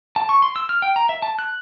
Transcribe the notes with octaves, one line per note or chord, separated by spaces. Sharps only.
A5
C#6
C6
E6
F6
G5
A#5
E5
A5
F#6